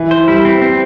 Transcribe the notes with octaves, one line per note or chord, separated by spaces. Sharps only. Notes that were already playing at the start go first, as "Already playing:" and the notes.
Already playing: E3
C5
G3 E4
C4
C4